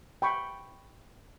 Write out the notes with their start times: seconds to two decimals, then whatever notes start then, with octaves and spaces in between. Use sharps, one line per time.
0.22 G5 B5 C#6